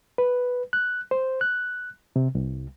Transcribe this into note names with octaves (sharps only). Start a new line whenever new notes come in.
B4
F#6
C5
F#6
C3
C2